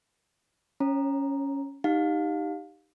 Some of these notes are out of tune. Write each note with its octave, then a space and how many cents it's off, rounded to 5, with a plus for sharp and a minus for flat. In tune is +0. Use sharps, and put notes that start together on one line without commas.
C#4 +0 C#5 -35 A#5 +0
D#4 +0 G4 +0 F5 +25